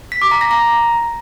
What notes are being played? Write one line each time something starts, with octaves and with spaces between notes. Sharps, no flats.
B6
D6
A#5
A#6
A#5